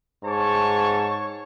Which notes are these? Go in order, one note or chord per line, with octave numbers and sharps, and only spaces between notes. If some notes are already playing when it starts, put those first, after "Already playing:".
G#2 C#5 A5 C#6